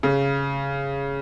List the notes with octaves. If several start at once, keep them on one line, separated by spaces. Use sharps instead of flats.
C#3